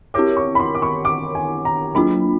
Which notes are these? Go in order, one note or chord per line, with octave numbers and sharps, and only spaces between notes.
C4 E4 G4 A#4 C#5 D6
C#6
B5
C6
D6
C#6
D6
G#5
A#5
F#3 A#3 D4 F4 B5